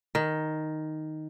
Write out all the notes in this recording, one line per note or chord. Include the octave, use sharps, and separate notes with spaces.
D#3